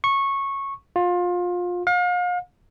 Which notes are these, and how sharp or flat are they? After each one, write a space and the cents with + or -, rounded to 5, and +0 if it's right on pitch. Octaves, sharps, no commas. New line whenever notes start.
C#6 -15
F4 +25
F5 +40